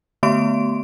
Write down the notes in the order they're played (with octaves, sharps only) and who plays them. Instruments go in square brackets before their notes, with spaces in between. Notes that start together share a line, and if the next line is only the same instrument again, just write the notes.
[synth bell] D3 A3 B3 C6 D7